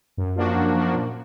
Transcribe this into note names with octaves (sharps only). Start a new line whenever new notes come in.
F#2
F3 A#3 D4 F#4
F#2
F3 A#3 D4 F#4
A#2